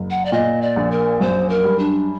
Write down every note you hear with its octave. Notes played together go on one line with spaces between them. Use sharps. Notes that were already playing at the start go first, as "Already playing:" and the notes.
Already playing: F#1
F#5
D5
A#2 D#5
D5
A#1
A#4
F#2 C5
A#4
G3
D4